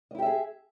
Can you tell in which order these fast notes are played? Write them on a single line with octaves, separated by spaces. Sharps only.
D#5 E4 G4 E5 G#4